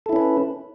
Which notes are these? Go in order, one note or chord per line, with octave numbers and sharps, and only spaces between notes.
C#4 E4 A4 B4